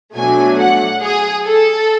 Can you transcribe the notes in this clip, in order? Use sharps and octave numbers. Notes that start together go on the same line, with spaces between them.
B2 F#3 A3 D4 G#5
F#5
G#4
A4